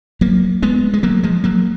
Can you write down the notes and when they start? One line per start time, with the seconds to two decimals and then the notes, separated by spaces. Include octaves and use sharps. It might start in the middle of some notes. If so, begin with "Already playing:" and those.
0.21 F#3 A#3
0.62 G#3 B3
0.93 G#3
1.03 F#3 A#3
1.23 F3 G#3
1.44 F#3 A#3